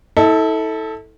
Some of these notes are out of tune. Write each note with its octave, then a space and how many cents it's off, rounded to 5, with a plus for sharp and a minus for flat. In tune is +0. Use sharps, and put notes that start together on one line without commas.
E4 -40 A4 +0